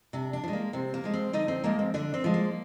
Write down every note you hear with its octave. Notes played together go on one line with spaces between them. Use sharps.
C3 D4
D4
F3
G#3
A#3
C3 C4
A#3
F3 G#3
C4
D3 D#4
C4
F3 G#3 A#3
C4
D3 D4
C4
F3 G#3
A#3